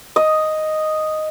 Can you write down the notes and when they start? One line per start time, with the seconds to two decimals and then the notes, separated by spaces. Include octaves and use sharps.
0.16 D#5